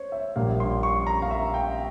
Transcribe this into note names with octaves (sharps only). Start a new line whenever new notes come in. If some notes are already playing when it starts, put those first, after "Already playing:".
Already playing: C5 C#5
E5
A#1 A#2 G3 A#3 F5
C6
C#6
A#5
F5
E5
G5